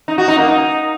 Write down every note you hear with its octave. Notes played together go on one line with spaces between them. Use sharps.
D#4
F#4
D#4
A#3
D#4